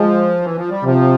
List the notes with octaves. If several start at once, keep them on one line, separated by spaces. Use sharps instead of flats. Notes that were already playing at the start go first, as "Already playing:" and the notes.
Already playing: F3 G#3
E3
F3
G3
C3 F3